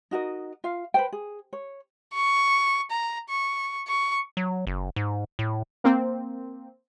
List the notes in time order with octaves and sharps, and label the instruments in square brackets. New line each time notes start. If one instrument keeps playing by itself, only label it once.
[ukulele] D#4 F#4 A#4 D#5
F4 F5
B4 C5 G5
G#4
C#5
[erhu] C#6
A#5
C#6
C#6
[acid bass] F#3
F#1
G#2
A2
[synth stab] A#3 C4